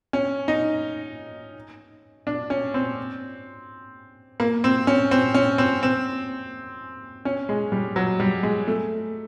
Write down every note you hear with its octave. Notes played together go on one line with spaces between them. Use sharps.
C#4
D#4
D4
C#4
C4
A#3
C4
C#4
C4
C#4
C4
C4
C#4
G#3
G3
F#3
G3
G#3
A3